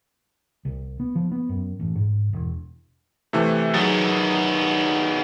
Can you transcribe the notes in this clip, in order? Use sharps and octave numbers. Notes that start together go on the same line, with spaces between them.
C2
B3
F3
B3
F#2
A1
G#2
E1
C3 E3 A3
D#3 F#3 B3 G#4 A6